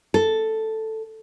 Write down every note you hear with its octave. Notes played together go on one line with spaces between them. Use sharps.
A4